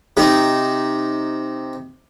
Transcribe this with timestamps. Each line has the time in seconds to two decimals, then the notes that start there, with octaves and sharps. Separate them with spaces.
0.17 C3 D#4